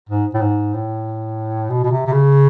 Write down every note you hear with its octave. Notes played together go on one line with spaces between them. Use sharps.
G#2
A2
G#2
A2
B2
B2
C3
C3
C#3